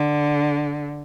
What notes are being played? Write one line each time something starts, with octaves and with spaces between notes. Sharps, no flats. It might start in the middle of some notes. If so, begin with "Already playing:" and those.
Already playing: D3